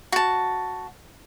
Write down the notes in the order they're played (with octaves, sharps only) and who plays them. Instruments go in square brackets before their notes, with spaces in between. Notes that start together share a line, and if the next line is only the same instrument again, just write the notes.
[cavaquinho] F#4 A5